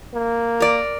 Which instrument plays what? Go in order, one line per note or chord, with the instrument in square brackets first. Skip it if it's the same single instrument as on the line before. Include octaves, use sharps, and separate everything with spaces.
[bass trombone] A#3
[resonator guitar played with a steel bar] A#4 D5